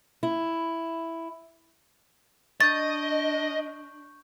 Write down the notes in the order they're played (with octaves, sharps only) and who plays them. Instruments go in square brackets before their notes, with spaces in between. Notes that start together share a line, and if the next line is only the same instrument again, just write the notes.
[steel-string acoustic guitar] E4
[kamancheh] D4 [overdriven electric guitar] D#5 [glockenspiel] C#6 G6 [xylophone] A6